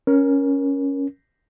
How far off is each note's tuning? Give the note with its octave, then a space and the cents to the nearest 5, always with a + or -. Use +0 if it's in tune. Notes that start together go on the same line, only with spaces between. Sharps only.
C#4 +0 A#4 +20